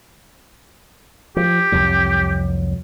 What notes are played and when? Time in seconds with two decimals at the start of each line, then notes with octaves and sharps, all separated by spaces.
1.37 F3 G4
1.72 C2 F2 F#3